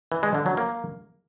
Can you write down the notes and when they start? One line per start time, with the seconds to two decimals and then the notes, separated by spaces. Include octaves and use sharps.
0.12 E3
0.23 G#3
0.34 D3
0.46 F#3
0.57 A#3